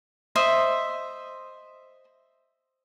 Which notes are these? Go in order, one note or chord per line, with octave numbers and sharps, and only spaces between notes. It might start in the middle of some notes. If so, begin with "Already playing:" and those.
C5 D#5 E5